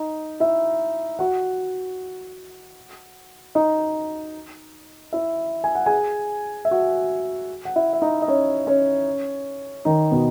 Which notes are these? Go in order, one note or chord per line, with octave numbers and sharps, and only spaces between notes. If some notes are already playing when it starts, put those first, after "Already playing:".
Already playing: D#4
E4 E5
F#4 F#5
D#4 D#5
E4 E5
G#5
F#5
G#4 G#5
E5
F#4 F#5
F#5
E4 E5
E5
D#4 D#5
D#5
C#4 C#5
C#4 C#5
D#3 D#4
B2 B3